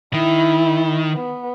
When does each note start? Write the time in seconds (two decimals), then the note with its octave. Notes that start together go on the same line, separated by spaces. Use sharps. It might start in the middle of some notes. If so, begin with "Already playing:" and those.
0.14 D#3 E4
1.14 B3